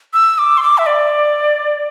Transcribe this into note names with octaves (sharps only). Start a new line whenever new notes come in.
E6
D6
C6
D6
E5
D5